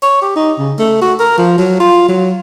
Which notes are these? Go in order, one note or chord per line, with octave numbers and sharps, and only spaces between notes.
C#5
G4
D#4
C#3
A3
F#4
A#4
F3
F#3
F4
F#3